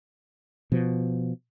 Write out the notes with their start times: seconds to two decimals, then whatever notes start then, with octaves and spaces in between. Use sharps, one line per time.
0.72 B2 F3